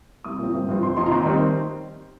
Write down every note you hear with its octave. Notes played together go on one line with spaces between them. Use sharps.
C2 D#6
A#2 F3 C4
G1
G2 F3 C4
F1 C6
F2 F3 D#4 C6
A#5
D#2 C6
D#3 G3 C4 D#4